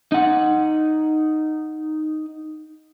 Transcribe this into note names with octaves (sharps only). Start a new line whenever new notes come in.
D#4 F#5